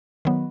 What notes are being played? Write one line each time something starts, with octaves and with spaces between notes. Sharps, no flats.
D#3 F#3 B3